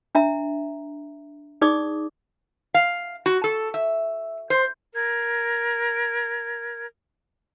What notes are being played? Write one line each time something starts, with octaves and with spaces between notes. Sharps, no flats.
D4 E5 A#5
D#4 G#4 D5 D6 D#6
F5
F#4
A4
E5
C5
A#4 G#6